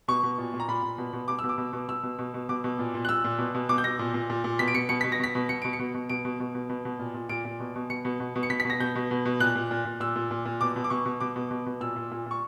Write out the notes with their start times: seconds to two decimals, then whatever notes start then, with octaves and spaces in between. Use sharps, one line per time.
0.08 B2 C#6
0.23 B2
0.38 A#2
0.54 A#2
0.60 A#5
0.68 A#2 B5
0.83 A#2
0.98 B2
1.13 B2
1.28 B2 D6
1.39 B2 E6
1.49 D6
1.58 B2
1.73 B2
1.88 B2 E6
2.03 B2
2.19 B2
2.34 B2
2.49 B2 D6
2.64 B2
2.79 A#2
2.94 A#2
3.05 F#6
3.09 A#2 E6
3.24 A#2
3.38 B2
3.54 B2
3.69 B2 D6
3.78 G6
3.84 B2 A#6
3.99 A#2
4.14 A#2
4.30 A#2
4.44 A#2
4.59 B2 B6
4.68 D7
4.74 B2 C#7
4.89 B2 C#7
5.01 B2 B6
5.12 A#6
5.20 B2 B6
5.35 B2
5.49 B2 C#7
5.62 B2 D7
5.73 C#7
5.79 B2
5.94 B2
6.09 B2 D7
6.25 B2
6.40 B2
6.55 B2
6.69 B2
6.85 B2
6.99 A#2
7.14 A#2
7.29 A#2 D7
7.45 A#2
7.60 B2
7.76 B2
7.90 B2 C#7
8.05 B2
8.20 B2
8.36 B2
8.43 C#7
8.50 B2 B6
8.60 B6
8.65 B2
8.70 A#6
8.80 B2 G6
8.95 B2
9.11 B2
9.25 B2
9.40 A#2 F#6
9.55 A#2
9.71 A#2
9.85 A#2
10.00 A#2 E6
10.16 A#2
10.31 A#2
10.45 A#2
10.61 B2 D6
10.76 B2
10.84 D6
10.90 B2 C#6
11.06 B2
11.20 B2 D6
11.36 B2
11.51 B2
11.66 B2
11.80 A#2 E6
11.96 A#2
12.11 A#2
12.26 A#2 C#6